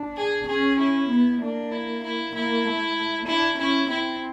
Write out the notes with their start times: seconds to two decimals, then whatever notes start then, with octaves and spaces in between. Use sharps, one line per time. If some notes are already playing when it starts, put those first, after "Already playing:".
Already playing: D4
0.17 G#4
0.48 C#4 G#4
0.79 E4
1.10 B3
1.41 A#3 D4
1.72 E4
2.04 E4
2.34 A#3 E4
2.65 A3
3.27 D4 E4
3.58 C#4 E4
3.89 C4 E4